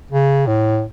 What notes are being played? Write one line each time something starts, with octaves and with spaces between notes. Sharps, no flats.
C#3
A2